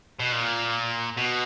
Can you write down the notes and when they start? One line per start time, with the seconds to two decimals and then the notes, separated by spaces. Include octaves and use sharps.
0.19 B2
0.32 A#2
1.17 B2